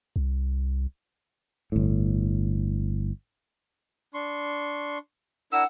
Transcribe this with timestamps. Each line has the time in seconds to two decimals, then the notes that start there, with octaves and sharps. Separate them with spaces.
0.16 C2
1.72 G1 A2
4.14 D4 C6 C#6
5.52 D4 E4 A#4 F#5 E6